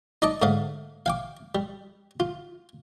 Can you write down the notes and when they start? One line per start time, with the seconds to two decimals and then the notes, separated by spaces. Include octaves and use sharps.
0.22 D#4 D5 D#5 A5 D6
0.42 G#2 D3 A3 F5
1.06 F5 G5 D6
1.55 G3
2.20 F4